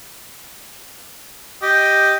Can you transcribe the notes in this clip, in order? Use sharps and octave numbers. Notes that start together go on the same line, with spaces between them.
G4 D#5